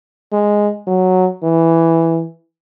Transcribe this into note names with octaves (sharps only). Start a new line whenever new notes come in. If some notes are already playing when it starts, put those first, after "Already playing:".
G#3
F#3
E3